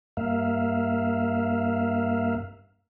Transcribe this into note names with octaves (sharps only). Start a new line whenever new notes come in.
G2 A#3 E5 F5